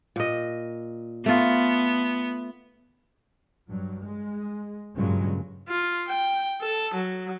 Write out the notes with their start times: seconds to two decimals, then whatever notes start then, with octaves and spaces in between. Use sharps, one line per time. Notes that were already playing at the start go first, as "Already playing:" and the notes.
0.16 A#2 D#5
1.26 A3 B3 F4
3.69 G2 F#3
4.03 G#3
4.95 G2 A#2 C#3 F#3 G#3
5.69 F4
6.08 G5
6.62 A4
6.94 F#3